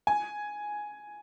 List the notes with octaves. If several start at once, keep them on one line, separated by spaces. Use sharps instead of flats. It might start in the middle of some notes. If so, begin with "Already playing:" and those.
G#5